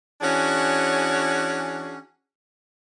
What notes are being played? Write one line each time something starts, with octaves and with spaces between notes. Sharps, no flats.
E3 C#4 D4 F#4 G#4 C#5